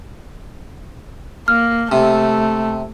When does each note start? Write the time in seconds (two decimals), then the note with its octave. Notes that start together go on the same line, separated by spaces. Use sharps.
1.48 A#3 F6
1.92 C3 A3